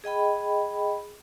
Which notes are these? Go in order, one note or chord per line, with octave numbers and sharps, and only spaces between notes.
G#4 D#5 G5 B5